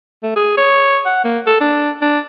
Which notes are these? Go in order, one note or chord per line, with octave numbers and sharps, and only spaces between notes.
A3
G#4
C#5
F#5
A#3
A4
D4
D4